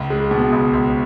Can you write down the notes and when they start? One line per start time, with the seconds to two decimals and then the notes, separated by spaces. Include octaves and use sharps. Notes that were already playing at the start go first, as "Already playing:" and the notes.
Already playing: C#2
0.10 G#3
0.31 B2
0.53 C#2
0.73 C#2